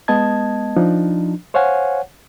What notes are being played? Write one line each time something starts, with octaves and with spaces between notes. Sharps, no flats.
G#3 B3 D#5 A5 G#6
F3 D4 D#4
C5 C#5 F5 F#5 G#5